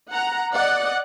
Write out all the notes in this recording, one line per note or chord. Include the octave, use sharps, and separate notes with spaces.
F#5 A#5
D5 D#5 F#5